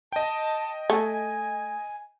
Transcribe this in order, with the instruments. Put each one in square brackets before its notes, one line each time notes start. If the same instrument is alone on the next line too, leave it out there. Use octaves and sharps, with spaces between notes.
[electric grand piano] D#5 G5 [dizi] A5
[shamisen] A3 [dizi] G#5